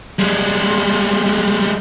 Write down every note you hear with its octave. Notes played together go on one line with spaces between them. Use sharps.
G3 G#3